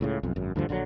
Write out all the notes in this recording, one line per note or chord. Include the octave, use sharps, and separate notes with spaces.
C#2 A2 C#3
B1 F2
G#1 F#2
D2 G2 D3 F3
A#1 D3 D#3 F#3